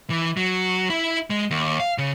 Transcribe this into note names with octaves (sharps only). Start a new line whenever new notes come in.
E3
F#3
E4
G#3
D#2
F5
C#3